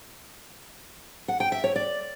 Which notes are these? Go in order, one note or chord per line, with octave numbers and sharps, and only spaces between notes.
F#5
G5
E5
C#5
D5